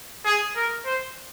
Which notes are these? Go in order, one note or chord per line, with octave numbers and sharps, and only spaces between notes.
G#4
A#4
C5